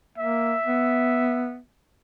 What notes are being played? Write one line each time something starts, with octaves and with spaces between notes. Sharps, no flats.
A#3 E5
B3